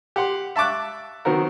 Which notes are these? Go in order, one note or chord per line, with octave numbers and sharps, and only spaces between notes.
G4 F#5 C6
E5 A5 C#6 D6 F#6
D#3 F#3 B3 C4 F#4 A#4